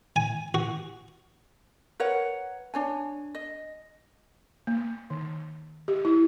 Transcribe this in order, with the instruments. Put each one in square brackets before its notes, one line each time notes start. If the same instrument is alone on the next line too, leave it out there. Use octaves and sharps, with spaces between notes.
[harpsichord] G#5
F#4
[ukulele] A#4 B4 C#5 F#5
D4 C#5 G#5
D#5
[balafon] A#3
D#3
G4
E4